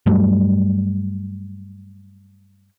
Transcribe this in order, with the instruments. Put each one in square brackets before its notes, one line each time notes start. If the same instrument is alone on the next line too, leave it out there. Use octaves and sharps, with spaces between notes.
[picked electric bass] G2 F#3 G3 A3